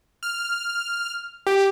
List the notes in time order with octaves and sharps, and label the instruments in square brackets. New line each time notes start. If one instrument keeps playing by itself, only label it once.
[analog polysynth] F6
G4